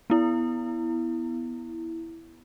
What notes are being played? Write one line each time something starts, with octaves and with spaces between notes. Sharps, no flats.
B3 E4